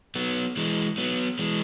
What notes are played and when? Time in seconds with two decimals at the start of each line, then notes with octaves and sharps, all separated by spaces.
0.15 F#3 B3
0.57 E3 G#3
0.98 F#3 B3
1.39 E3 G#3